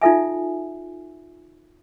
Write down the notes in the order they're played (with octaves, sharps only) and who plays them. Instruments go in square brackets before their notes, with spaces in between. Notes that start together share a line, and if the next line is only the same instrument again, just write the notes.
[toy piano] D#4 F4 A4 E5 G#5